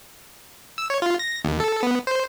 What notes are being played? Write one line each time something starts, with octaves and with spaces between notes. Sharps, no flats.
E6
C#5
F4
A#6
D#2
A4
B3
C5